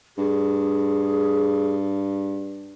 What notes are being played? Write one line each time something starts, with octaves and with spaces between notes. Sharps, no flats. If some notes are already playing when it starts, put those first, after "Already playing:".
G2 G#4